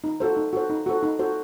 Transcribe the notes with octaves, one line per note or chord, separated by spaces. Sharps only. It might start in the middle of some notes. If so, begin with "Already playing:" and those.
D#4
F#4 A4 C5
D#4
F#4 A4 C5
D#4
F#4 A4 C5
D#4
F#4 A4 C5